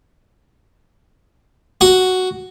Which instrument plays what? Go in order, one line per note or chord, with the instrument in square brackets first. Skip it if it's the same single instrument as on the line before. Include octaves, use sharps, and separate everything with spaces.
[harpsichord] F#4